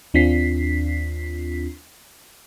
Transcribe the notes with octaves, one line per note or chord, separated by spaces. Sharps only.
D#2 C4 D4 F4 B6 C7